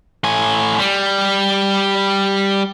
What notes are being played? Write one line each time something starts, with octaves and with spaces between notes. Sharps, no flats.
A2 G#5
G3